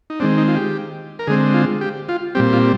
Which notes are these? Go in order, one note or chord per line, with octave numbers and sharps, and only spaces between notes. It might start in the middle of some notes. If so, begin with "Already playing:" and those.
D#4
D#3 G#3 C4 D4
D#4
F4
G4
A#4
D3 G#3 C4 G#4
F4
G4
F4
A#2 G3 C4 G4
F4